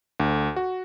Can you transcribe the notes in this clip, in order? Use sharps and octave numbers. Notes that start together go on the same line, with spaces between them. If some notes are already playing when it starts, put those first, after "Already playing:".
D2
F#4